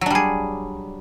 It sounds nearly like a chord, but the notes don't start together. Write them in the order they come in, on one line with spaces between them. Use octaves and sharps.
F#3 D4 G3 G#4